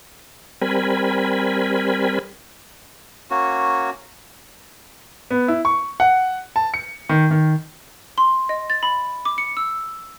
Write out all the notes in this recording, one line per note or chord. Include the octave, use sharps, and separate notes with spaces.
G3 C4 A#4 G#5 B5
A#3 C#4 F#4
B3
E4
C#6
F#5
A5
C#7
D#3
D#3
C6
D#5
A6
B5
D6
C#7
E6